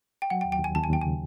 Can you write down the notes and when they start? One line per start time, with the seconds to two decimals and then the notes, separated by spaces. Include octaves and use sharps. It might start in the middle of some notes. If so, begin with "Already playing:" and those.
0.22 G5
0.30 F#3 F#5
0.41 G5
0.45 D#2
0.52 G5
0.59 D#2 G#5
0.75 D#2 A5
0.84 G#5
0.90 D#2 G5
1.01 C#3 G#5